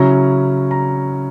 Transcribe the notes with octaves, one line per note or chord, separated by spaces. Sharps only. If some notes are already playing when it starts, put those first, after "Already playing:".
Already playing: C#3 F#3 C#4 E4 A#5
A#5